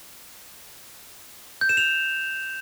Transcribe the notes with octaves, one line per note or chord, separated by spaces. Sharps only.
G6
E7
F7